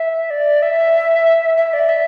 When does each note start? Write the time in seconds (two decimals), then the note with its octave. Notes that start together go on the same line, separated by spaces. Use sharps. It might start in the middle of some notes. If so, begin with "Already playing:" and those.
Already playing: E5
0.30 D5
0.62 E5
1.57 E5
1.73 D5
1.89 E5